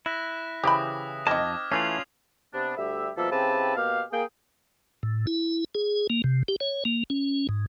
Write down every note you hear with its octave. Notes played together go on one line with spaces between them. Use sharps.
E4 F#6 A#6 B6
C#3 E3 G4 C5 B5 D#6
F2 C4 D#4 D#5 A5 D6 F6 G#6
E3 A3 C#4 F4 C7 F7 F#7
C3 B3 D4
D2 G3 G4 E5
B2 F3 G3 A#3 A4 E5
C#3 C4 E4 G4 B4 A5
B2 A#3 G4 F5
A#3 G#4 G5
A2
E4
G#4
A#3
C3
G4
C#5
A#3
C#4
G#2